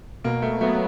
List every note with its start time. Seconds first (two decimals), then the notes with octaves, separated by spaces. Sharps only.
0.24 B2 A#3
0.42 A3
0.60 F#3 A3 B3